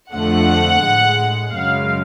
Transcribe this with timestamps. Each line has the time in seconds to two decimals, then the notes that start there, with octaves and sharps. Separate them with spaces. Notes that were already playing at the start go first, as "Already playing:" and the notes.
0.13 F2 D3 F3 A3 F#5
0.84 A2 G#3
1.55 F#2 C#3 G#3 F5